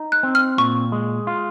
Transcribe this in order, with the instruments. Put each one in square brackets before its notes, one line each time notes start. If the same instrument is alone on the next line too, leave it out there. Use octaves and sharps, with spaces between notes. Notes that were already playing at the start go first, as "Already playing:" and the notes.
Already playing: [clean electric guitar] D#4
[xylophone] F#6
[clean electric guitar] C4
[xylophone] F6
[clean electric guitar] A#2 [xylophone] C#6
[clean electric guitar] G#3
F4